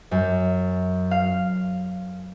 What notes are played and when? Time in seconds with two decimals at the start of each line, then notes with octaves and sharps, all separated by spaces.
0.11 F#2
1.11 F5